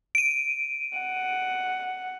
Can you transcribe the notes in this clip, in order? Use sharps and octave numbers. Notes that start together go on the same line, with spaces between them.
D7 D#7
F#5